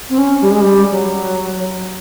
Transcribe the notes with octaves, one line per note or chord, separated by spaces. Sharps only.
C4
C#4
G3
G#3
G3
F#3